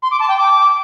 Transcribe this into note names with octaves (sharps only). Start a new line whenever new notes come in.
C6
D6
A5
G5
D6